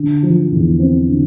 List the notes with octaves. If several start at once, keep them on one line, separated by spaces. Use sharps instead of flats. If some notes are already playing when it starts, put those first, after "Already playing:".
Already playing: D3
F3
E2
C4
D3